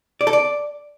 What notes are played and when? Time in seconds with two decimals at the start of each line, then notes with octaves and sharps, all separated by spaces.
0.21 D5
0.27 A4
0.33 D5